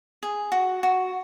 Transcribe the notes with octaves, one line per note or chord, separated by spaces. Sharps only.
G#4
F#4
F#4